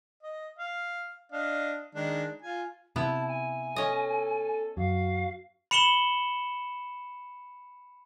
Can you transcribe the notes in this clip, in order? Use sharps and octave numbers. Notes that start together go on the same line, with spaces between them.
D#5
F5
D4 D#5 F5
D#3 G#3 D4
F4 G#5
C3 B3 E4 A5
G#5
C#4 A4 D#5
F#2 F#4 F5
B5 C#7 E7 F#7 G7